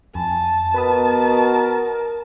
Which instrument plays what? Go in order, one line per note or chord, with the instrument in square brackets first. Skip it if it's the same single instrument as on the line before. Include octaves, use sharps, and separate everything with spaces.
[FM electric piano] F2 [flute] G#5 [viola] A5
[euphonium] B2 [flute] A#4 [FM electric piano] B4 B5 D#6